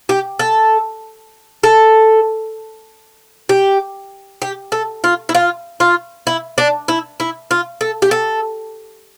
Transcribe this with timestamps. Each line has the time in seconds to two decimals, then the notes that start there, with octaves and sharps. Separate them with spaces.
0.09 G4
0.39 A4
1.63 A4
3.49 G4
4.42 G4
4.72 A4
5.04 F4
5.29 E4
5.35 F4
5.80 F4
6.27 E4
6.58 D4
6.88 E4
7.20 E4
7.51 F4
7.81 A4
8.02 G4
8.11 A4